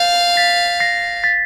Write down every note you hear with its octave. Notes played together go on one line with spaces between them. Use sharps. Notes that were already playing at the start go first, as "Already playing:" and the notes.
Already playing: F5 G6 A6
A6 B6
A#6 C7
A6 B6